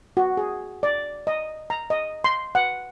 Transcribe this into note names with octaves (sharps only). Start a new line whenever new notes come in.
F#4
G#4
D5
D#5
A#5
D#5
C6
F#5